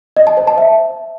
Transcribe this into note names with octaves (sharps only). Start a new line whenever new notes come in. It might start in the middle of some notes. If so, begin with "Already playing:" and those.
D#5
A5
C5
A5
E5